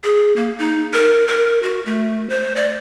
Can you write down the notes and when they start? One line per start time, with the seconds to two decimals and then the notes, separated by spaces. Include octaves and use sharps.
0.04 G#4
0.36 A#3
0.58 D#4
0.93 A#4
1.28 A#4
1.63 F#4
1.86 A3
2.30 C5
2.56 D5